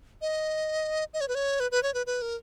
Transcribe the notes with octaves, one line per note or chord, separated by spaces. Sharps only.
D#5
D#5
C#5
B4
C#5
B4
B4
C#5
B4
B4
A#4